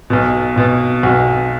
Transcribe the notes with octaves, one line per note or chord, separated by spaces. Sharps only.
B1 B2
B1 B2
B1 B2 F#4